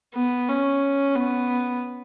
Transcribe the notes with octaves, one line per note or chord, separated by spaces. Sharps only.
B3
C#4
B3